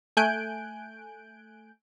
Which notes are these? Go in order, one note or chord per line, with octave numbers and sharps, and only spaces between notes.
A3 G#5 F#6 G6 D7